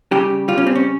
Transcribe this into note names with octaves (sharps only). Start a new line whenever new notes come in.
C#3 G3 G4
C#3 G3 F4
C#4
C4
C#4